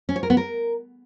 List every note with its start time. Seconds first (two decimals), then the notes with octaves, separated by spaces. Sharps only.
0.09 C#4
0.16 C#5
0.23 A#4
0.30 B3
0.37 A#4